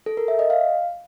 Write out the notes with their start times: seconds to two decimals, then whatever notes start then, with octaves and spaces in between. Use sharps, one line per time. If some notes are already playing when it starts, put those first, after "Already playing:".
0.06 A4
0.17 A#4
0.28 E5
0.39 D#5
0.50 F5